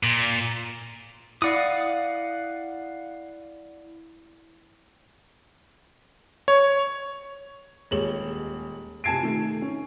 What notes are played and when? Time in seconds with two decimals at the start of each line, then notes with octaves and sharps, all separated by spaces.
0.03 A#2
1.42 E4 D5 F5 F#5 D#6
6.48 C#5
7.91 D#1 G#3 C#5 F#7
9.04 C3 G#5 A5 G#6 C7 D7
9.23 D#3 A3
9.62 C#4